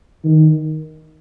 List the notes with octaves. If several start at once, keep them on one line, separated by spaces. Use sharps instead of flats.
D#3